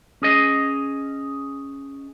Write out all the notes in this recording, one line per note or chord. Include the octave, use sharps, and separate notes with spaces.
C#4 G#4 D#5